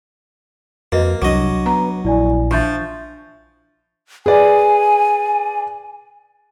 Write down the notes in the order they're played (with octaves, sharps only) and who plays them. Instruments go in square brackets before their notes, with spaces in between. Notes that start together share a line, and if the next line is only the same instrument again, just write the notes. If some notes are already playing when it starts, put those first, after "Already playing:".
[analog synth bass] F2 [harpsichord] A#3 [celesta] F#4 D#5 [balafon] A#4 B4
[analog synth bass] C2 [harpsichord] F#3 D#5 [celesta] D4 C#6 D6
[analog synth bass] B3 [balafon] A#5
[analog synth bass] A#1 [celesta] E4 D5 G#5
[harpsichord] F3 [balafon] D4 E5 [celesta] C#6 G6 A6
[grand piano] G#4 B4 D5 [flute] G#5